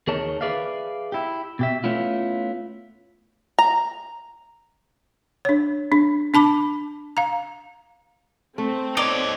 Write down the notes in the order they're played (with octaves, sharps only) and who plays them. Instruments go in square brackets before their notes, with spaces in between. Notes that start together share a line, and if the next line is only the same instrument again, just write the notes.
[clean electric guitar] D#2 G#4 A#4 C#5 D#5 A5
G#4 B4 D5 E5 F5
E4 G4
B2 G4 E5
A3 B3 C#4 E4 F4
[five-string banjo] A#5
[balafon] D4 C#5
D4
D4 A5 B5 D6
F5 A#5
[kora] A3 [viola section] C4
[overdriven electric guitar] D#4 C#5 [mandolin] D5